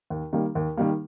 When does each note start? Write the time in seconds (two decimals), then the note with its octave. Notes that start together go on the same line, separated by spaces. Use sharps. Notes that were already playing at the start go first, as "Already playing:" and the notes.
0.10 D#2
0.33 D#3 G3 A#3
0.55 D#2
0.77 D#3 G3 A#3